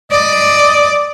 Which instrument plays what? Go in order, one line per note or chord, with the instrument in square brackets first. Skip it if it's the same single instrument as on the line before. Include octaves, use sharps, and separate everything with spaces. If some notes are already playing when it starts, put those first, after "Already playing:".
[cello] D5 [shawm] D#5